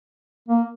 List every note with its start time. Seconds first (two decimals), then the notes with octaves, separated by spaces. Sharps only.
0.48 A#3